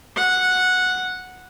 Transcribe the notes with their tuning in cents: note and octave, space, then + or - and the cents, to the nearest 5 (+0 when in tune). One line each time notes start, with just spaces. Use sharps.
F#5 -10